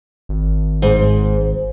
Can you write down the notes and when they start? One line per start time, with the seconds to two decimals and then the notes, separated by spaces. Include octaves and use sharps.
0.29 G#1
0.82 G#2